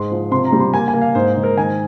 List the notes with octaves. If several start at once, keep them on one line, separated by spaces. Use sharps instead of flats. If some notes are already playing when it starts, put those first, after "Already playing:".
Already playing: G#2 G#3 C6
F3
C3 C6
A#5
G3
C6
A#3 G#5
G#5
A#3
F5
G#2 C5
G#2
A#4
D#3 G#5